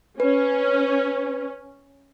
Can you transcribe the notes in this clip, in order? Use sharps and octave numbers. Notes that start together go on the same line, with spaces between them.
C#4 B4